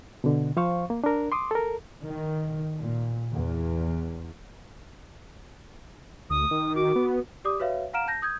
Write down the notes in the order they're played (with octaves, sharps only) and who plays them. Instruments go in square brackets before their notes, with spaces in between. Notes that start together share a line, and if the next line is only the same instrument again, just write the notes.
[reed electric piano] B2 D3
F3 C5 F5 C#6
A#3
D4 A#4
C6 D6 D#6
A4 A#4
[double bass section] D#3
A#2
E2
[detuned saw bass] D2 [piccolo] D#6
[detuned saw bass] D#3
[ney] F#4 [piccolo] D6
[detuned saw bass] B3
[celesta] G4 D5 D6 D#6
F#4 B4 C#5 E5 F5
F5 F#5 A#5 F6 D7 E7
A5 G6 A#6
D#6 G6 G#6